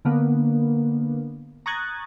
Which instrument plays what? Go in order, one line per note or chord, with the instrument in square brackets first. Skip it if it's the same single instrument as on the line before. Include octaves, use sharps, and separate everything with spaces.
[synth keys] D3 A#3 B3
A#5 C#6 D#6 F#6 G#6 A6